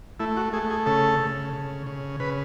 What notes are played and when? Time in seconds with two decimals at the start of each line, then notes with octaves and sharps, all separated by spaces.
0.20 A3 E4
0.37 F#4
0.53 A3 G#4
0.70 G#4
0.86 C#3 A4
1.20 C#3
1.53 C#3
1.87 C#3
2.20 C#3 B4